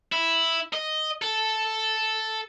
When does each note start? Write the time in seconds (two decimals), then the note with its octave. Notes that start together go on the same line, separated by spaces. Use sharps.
0.12 E4
0.73 D#5
1.22 A4